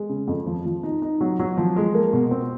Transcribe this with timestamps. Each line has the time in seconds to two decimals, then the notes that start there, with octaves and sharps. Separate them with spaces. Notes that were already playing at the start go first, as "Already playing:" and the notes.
Already playing: G#3
0.09 C#3
0.27 F2
0.46 F3
0.65 F3
0.83 D#4
1.02 D#4
1.21 F#3
1.39 F#3
1.57 F3
1.76 G#3
1.94 A#3
2.13 B2
2.31 C4